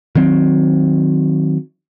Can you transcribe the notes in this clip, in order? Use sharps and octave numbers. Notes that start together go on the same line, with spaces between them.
D#3 F#3 C4